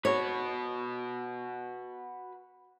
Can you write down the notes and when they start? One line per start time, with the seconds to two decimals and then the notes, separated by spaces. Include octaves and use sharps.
0.05 F#4 B4 C#5